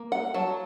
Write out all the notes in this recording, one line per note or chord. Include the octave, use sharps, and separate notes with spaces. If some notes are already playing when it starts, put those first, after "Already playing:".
Already playing: A#3
F#5
F#3 A5